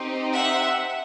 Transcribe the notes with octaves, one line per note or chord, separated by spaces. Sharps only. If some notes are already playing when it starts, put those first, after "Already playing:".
Already playing: C4 D#4 G4
E5 F#5